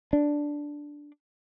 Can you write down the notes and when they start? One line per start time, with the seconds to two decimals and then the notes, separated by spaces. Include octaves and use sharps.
0.13 D4